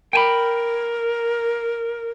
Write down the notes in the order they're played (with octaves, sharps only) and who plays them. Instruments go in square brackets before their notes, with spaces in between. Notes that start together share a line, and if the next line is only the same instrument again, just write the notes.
[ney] A#4 [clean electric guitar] G5 G#5 B5